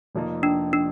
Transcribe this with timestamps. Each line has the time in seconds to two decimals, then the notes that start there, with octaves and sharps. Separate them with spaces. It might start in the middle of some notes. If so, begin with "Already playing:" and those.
0.15 F1 F2 F3 A#3 D#4
0.43 D4
0.73 D4